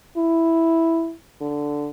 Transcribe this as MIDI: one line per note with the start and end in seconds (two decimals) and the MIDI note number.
0.17 1.12 64
1.41 1.90 50